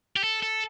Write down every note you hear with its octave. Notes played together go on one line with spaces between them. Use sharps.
G4
A4
A4